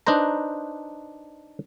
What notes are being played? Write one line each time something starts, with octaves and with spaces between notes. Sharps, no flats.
D4 D#4 B4 C5 A#5